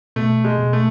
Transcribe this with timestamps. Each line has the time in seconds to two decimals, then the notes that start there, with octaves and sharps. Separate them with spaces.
0.16 B2 A3
0.44 G#3
0.58 B2
0.73 A3